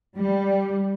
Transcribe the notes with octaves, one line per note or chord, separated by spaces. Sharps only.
G3